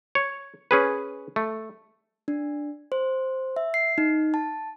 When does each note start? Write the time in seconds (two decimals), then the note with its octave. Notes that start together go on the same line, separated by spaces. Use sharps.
0.15 C#5
0.71 C#4 G#4 B4
1.36 A3
2.28 D4
2.92 C5
3.56 E5
3.74 C7
3.98 D#4
4.34 A5